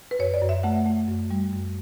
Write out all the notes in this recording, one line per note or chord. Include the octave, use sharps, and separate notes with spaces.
B4
F#2 C#5
D5
F#2
E5
A3 F#5
A3
F#2
G3
F#2